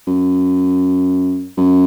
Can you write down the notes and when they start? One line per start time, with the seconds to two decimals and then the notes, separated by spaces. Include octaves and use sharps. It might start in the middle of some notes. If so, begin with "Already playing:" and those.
0.07 F#2
1.58 F#2